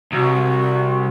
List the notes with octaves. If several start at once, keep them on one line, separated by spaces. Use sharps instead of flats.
C2 F#4